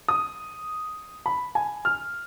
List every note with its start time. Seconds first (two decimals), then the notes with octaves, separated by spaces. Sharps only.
0.08 D#6
1.26 B5
1.55 G#5
1.85 F6